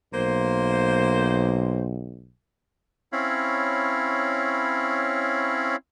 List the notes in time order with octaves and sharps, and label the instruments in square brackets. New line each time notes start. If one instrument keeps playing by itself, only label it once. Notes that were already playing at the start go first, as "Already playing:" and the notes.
[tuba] B1 [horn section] A#3 C5
[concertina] C4 C#4 E4 C#5 F5 B5